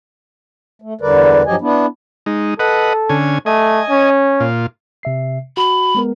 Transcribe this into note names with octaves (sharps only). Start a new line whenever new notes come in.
A3
E2 D3 G3 A#4 B4 D5
G2 F3 F#3 G4 D#5 G#5
B3 D4 E4
G#3 D#4
A4 B4 D#5 F#5
D3 C#4 G#5
A3 D#5 G#5
C#4
A#2 F4
C3 E5 C7
F#4 B5
G#3 B3 A#4